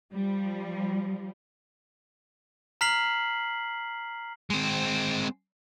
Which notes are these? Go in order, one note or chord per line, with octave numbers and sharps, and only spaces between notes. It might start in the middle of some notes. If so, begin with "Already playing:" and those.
F3 G3
A#5 F6 B6 C7 F#7
G#3 C4